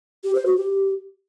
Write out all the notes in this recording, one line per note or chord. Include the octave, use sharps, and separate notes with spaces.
G4
C5
F#4
G4